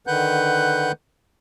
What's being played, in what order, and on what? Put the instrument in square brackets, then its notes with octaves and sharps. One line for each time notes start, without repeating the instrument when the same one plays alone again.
[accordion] D3 D#3 B4 F#5 F#6 G6